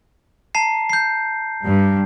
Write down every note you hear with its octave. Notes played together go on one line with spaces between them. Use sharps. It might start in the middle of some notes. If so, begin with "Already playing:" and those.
A5 A#5 C7
G6 C7
G2